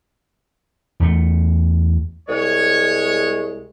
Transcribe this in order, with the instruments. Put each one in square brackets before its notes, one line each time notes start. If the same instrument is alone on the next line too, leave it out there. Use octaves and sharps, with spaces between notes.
[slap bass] E2 A3
[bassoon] C2 [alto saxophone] G#3 [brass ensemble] C#5